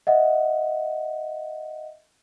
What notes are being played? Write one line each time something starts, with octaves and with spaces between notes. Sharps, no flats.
D#5 E5 F#5